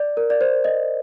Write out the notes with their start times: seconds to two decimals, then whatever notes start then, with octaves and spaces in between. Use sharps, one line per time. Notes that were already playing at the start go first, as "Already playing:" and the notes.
Already playing: D5
0.17 A#4
0.30 D5
0.41 C5
0.64 D#5